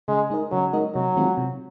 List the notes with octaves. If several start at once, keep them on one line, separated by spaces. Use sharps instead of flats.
C#3 G#3
G#3 D#4 A#4 D#5
C#3 F#3
G#3 D#4 A#4 D#5
C3 F#3
D#3 G#3 C4 F4
C3